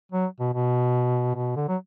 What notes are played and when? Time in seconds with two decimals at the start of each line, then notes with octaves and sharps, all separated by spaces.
0.12 F#3
0.40 B2
0.53 B2
1.35 B2
1.56 D3
1.68 F#3